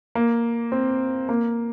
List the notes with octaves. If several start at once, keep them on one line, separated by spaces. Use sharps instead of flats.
A#3
C4
A#3